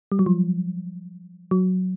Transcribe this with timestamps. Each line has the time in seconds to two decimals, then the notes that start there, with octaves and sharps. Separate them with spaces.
0.12 G3
0.19 F#3
0.26 F3
1.51 F#3